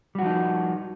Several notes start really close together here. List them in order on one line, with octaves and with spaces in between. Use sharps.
G3 F#4 F3 D#4